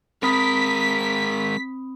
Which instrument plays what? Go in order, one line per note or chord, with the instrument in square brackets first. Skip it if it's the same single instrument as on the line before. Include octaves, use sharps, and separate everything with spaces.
[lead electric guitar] G#3 A#4 [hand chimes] C4 B5 D#6 [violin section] B6